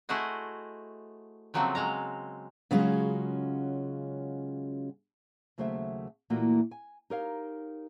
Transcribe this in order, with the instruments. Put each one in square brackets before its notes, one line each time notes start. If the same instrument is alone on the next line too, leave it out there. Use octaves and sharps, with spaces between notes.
[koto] A3 E4 F#4 G#4 C5 D#5
C#3 F3 F#3 A3 A#3 C4
F#3 G#3 F5 A#5
[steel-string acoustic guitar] C#3 F#3 G#3 C#4 F4 F#4
[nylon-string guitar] D#2 C#3 F#3 A3 C5 E5
A#2 E3 A3 A#3 F4 F#4
G#5
D#4 G4 A#4 C#5 F5